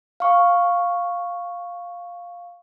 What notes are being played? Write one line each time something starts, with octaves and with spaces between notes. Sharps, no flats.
F5 C#6